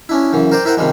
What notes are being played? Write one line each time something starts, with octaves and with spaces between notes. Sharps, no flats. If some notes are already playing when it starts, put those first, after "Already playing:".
C#4 D4 E4
F#2 C#3 E3
A#4 C5 D5 G5
E4 A#4 C5 F#5 G5
C3 D#3 F3 G3 G#3